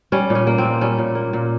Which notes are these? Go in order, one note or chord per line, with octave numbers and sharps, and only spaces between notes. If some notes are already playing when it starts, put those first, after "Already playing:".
G3 C#4
A#2
C#4
A#3
C4
A#2
G3 C#4
A#2
A#3
A#2